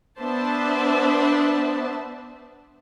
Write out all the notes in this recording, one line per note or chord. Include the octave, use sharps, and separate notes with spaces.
B3 D4 C5 E5 A5